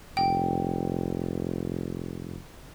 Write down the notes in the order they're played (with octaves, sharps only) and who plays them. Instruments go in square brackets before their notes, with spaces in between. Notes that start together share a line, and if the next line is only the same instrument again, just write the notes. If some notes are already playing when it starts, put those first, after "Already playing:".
[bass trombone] F1 [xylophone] G5